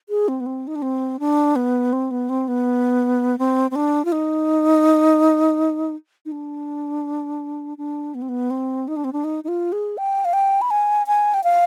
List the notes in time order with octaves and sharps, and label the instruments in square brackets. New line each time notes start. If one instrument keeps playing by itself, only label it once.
[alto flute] G#4
C4
B3
C4
D#4
D4
C4
D4
B3
C4
B3
C4
B3
C4
C4
D4
F4
D#4
D#4
D4
D4
B3
C4
B3
C4
D#4
D4
C4
D4
D#4
D#4
F4
G#4
G5
F5
G5
B5
G#5
G#5
G5
F5